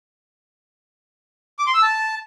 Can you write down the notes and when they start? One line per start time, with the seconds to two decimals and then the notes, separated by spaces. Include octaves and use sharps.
1.59 D6
1.67 C6
1.74 E6
1.82 A5